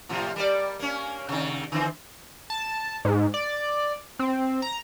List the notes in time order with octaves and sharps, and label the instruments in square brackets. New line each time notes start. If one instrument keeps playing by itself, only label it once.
[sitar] A2 C3 F3
G3 A#4 D5
A#3 C#4
C3 D#3
D3 E3 C4
[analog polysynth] A5
G#2
D5
C4
A#5